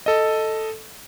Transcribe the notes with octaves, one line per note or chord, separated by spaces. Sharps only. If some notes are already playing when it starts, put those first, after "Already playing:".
A4 D#5